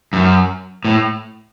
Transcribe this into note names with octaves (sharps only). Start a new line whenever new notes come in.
F#2
A2